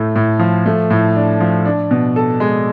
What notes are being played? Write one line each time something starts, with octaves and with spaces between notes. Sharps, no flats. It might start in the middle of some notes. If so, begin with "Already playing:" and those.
Already playing: A2 A3
A2
F3
A3
A2
D4
F3
D4
B2
A4
G#3